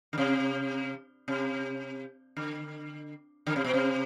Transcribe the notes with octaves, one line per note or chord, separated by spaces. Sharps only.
D3
C3
C3
D3
D3
C3
B2
C3